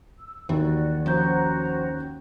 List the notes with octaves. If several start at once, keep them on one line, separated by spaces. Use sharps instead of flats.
E6
D#2 E3 F#4 D5
F3 C#4 F#4 C5 A#5 G6